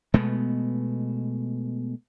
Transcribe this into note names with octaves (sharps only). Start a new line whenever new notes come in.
B2 G#3 A3 B3